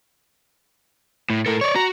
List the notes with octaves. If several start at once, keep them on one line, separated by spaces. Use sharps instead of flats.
A2
A2 A4 A#4
C#5 D5 C#6
F#4 A#5